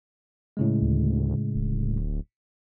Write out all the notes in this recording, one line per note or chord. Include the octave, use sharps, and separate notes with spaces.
A2 C#3 G#3
D2
D1